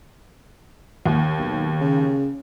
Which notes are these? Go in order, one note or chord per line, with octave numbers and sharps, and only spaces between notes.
D#2
B1
C#3